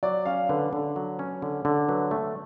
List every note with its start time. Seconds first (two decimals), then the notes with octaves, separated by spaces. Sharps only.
0.03 F#3 D5
0.26 C#4 F5
0.49 D3 B4
0.73 D3
0.96 F#3
1.19 C#4
1.42 D3
1.65 D3
1.88 F#3 B4
2.11 A3